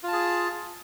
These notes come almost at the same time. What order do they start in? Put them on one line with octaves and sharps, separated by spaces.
F4 A5 G#4